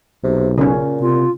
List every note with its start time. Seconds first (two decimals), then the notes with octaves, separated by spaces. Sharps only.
0.24 B1 C3
0.58 A#2 C#3 C#4
1.01 C3 F4